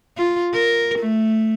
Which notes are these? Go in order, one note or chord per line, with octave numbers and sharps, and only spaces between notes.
F4
A#4
A3